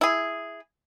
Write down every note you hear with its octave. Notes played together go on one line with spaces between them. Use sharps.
E4 G#4